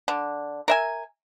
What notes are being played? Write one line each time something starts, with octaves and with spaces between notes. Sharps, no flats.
D3
A#4 E5 G#5